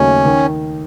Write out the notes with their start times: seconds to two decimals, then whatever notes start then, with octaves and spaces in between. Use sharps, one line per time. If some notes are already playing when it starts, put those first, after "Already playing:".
Already playing: D#2 C#3 F#3 A3 C#4 D#4
0.26 D#3